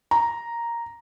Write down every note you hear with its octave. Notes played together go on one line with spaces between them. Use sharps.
A#5